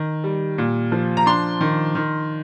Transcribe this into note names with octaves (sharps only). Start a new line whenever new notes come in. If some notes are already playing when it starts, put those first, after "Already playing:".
Already playing: D#3
G3
A#2
F3
A#5
D4 C6
D#3
D#3